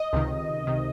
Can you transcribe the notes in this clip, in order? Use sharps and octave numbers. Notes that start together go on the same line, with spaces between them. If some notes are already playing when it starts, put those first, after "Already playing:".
Already playing: D#5
C#2 C3 D#3
C3 D#3